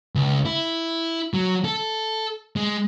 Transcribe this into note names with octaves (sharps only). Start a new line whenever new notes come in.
C#2
E4
F#3
A4
G#3